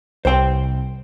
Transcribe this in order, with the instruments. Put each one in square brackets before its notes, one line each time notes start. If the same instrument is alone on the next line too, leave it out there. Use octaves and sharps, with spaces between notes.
[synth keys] C2 [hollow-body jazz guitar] C5 G5